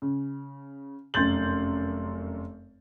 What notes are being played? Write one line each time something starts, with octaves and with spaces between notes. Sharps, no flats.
C#3
F1 F#2 C6 G6 A6 F#7